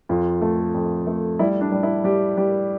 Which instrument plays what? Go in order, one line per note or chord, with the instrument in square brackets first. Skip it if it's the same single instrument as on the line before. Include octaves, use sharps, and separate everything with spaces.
[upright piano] F2 F4
A3
F2
A3
G3 E4
D4
G3
E4
G3 G4
G3 G4